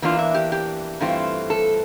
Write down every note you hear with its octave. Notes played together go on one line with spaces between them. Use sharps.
E2 E3 A#3 D4 F4
E5
G4
G4
G2 E3 A3 C4 F4
A4